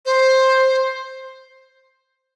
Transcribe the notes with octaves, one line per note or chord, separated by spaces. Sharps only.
C5